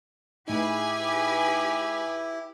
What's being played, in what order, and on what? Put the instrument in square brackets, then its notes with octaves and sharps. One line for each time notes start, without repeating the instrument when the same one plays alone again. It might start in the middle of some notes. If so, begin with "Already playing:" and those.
[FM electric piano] A2 D#4 [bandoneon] E4 [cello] G4 [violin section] G#4 B4 G#5